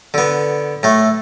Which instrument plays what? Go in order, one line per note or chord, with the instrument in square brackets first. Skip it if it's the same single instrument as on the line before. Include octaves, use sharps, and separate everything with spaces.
[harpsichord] D3 B3
A2 A3